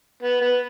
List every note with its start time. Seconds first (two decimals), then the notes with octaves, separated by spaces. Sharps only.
0.23 B3
0.41 B3